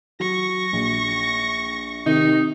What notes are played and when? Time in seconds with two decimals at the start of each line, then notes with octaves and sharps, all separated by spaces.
0.20 F#3 C#6 A#6
0.73 A#1
2.06 C3 D#3 D#4